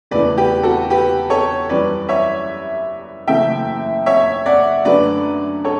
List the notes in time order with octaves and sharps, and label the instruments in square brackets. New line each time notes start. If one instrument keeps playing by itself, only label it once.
[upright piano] E1 E2 C#3 E3 A3 B4 D5
G4 B4
F#4 A4
G4 B4
A4 C#5
F#2 E3 G3 B4 D5
C#5 E5
F#1 F#2 C#3 E3 A3 E5 G5
C#5 E5
D5 F#5
F#2 D3 F#3 A3 C#4 B4 D5
A4 C#5